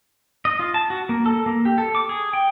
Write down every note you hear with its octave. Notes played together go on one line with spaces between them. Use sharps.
D#5
F4
A5
F#4
A#3
A4
A#3
G4
A4
D6
G#4
G5